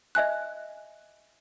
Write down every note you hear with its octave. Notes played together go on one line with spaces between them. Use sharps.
D#5 E5 G#5 F#6